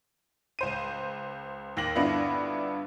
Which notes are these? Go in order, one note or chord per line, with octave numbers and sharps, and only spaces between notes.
C#2 C5 D#7
D#2 A#3 A#6 F#7
G2 D3 B3 D4 E4 F4